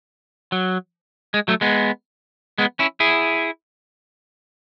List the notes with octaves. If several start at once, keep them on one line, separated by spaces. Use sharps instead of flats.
F#3
G#3
F#3 A3
G#3 B3
G#3 B3
C#4 E4
E4 G#4